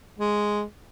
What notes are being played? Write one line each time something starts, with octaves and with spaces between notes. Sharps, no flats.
G#3